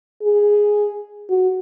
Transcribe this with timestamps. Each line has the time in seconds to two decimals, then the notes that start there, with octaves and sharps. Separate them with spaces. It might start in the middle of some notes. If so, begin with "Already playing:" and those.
0.22 G#4
1.29 F#4